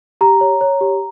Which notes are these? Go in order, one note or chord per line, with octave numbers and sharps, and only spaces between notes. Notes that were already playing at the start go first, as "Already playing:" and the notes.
G4 A#5
C#5
C#5
G4